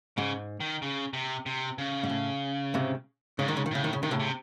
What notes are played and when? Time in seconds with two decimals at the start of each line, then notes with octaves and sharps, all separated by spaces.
0.17 G#2 C#3
0.60 D#3
0.82 C#3
1.13 C3
1.46 C3
1.78 C#3
2.03 G#2
2.10 A2
2.74 G#2 C3
3.39 G#2 C#3
3.48 D#3
3.57 C#3
3.66 D#3
3.71 A2 C#3
3.84 D#3
3.93 C#3
4.03 C3 D#3
4.11 A2 C#3
4.20 C3